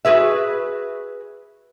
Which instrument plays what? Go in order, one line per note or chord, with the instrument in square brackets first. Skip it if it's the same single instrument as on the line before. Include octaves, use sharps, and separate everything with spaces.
[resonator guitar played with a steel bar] F#4 G#4 B4 E5